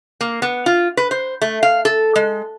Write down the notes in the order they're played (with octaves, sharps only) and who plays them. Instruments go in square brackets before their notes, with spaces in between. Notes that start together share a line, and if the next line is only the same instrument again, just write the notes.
[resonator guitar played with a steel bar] A#3
B3
F4
B4
C5
A3
F5
A4
G#3